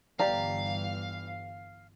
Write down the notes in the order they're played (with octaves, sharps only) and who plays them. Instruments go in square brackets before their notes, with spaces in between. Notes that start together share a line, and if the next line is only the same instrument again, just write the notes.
[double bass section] G1 E3 [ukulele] G4 D5 A#5 [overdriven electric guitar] F5